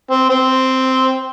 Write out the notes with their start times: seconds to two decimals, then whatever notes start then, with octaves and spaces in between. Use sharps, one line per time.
0.11 C4
0.30 C4